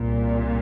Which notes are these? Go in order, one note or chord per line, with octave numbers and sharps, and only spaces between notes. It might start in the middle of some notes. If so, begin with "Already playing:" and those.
Already playing: C2 A#2